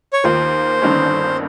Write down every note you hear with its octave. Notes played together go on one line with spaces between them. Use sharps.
C#5
D#2 D#3 A#3 F4 C5
G1 G2 D#3 A#3 C#4